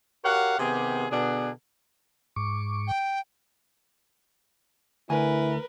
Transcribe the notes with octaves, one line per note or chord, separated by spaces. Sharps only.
F#4 G4 A#4 C#5 F5 F#5
C3 D#3 B3 G4 G#4
B2 D3 B3 D4 G#4
G#2 C#6 D6
G5
D2 E4 A#4 B4 G#5